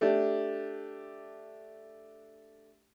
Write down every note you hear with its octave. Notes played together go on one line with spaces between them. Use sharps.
A3 D4 G4